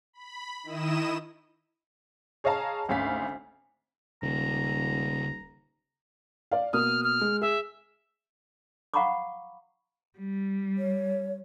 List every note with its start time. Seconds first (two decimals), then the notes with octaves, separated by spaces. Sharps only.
0.13 B5
0.64 D#3 E4 D#5 D#6 E7
2.44 G#4 C#5 D#5 F5 A5 A#5
2.88 G#1 D2 C#4 F5 B6
4.23 D#1 C#2 A#5
6.51 D5 F5
6.73 B2 A#3 D#6 F6
7.04 F6
7.21 G#3
7.41 G#4 E5
8.94 F5 F#5 A#5 B5 C#6 D6
10.18 G3
10.78 C#5